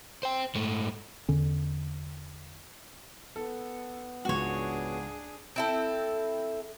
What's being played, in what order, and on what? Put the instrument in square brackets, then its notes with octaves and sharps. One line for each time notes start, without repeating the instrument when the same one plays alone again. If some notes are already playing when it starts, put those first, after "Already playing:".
[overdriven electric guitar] C5 G5
G#2 A3
[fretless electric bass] E2 D3 C#4
[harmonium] B3 [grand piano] A4
[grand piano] C#2 G#2 [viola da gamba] D4 G#4 [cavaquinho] F#4 C#5
[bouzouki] C4 E4 A4